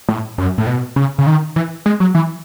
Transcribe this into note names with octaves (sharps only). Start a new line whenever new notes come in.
A2
F#2
A2
B2
C#3
C#3
D#3
E3
G#3
F#3
E3